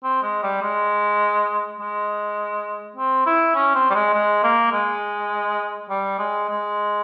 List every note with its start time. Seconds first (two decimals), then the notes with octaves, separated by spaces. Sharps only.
0.04 C4
0.23 G#3
0.43 G3
0.62 G#3
1.80 G#3
2.97 C4
3.26 E4
3.55 C#4
3.75 C4
3.90 G3
3.95 G#3
4.14 G#3
4.44 A#3
4.72 G#3
5.90 G3
6.19 G#3
6.49 G#3